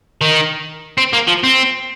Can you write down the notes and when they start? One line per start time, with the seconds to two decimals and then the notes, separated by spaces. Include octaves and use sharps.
0.21 D#3
0.98 C4
1.13 A#3
1.28 F3
1.44 C4